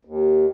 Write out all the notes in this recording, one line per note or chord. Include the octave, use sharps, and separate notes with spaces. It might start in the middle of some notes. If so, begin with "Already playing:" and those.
D#2